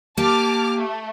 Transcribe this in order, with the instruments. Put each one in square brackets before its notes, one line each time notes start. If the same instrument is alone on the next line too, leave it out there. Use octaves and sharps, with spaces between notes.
[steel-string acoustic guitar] A#3 G4 [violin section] A5 D6 F6
[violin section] A3